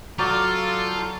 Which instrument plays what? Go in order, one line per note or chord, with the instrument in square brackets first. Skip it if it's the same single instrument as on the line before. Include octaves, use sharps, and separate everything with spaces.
[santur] F#3 D5 [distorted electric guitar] F4 [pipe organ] A4 G6